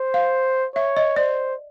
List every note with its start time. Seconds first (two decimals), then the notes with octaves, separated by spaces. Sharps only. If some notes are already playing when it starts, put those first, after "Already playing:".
Already playing: C5
0.14 F5
0.75 C#5 E5
0.97 D#5
1.16 C5 D5